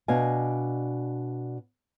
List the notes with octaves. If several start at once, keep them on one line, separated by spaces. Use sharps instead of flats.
B2 D4 D#5 F5 G#5